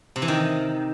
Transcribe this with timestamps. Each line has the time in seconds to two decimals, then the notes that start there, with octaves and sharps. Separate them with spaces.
0.16 C3
0.22 E3
0.28 D#3